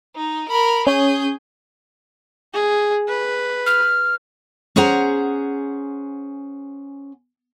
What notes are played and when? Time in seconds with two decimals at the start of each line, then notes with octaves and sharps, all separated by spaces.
0.15 D#4
0.49 A#4 B5
0.87 C#4 G#4 C#5 G6
2.54 G#4
3.08 B4
3.66 F6
4.76 C#4 G#4 C5 F#5 A#5